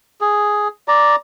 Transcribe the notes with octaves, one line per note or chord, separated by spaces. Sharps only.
G#4
D5 A#5